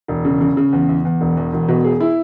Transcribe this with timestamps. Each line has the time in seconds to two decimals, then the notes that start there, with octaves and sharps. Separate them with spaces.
0.08 E1
0.25 C#3
0.41 C#3
0.57 C#3
0.73 E2
0.89 E2
1.05 E2
1.21 E1
1.37 E2
1.53 E1
1.68 B2
1.84 G#4
2.00 E4